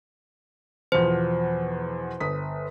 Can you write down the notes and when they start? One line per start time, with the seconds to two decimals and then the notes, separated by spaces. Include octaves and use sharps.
0.92 E2 B2 F3 C5
2.20 G1 D#6 B6